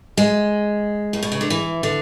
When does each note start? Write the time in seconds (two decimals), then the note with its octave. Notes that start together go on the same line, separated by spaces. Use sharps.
0.17 G#3
1.13 A2
1.23 B2
1.32 C#3
1.41 D3
1.50 E3
1.83 D3